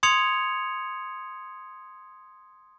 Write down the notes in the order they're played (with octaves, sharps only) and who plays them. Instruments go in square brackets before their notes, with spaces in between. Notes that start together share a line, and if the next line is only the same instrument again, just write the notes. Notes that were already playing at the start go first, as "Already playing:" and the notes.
[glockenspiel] C6 D#6 G#6 C#7 F7